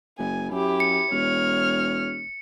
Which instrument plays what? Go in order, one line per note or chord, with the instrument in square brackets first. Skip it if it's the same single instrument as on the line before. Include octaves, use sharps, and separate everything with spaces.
[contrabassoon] F#1 [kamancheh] G#5
[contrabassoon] F#2 [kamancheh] E4 G4
[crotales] C#7
[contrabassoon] E1 [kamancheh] C#5 F6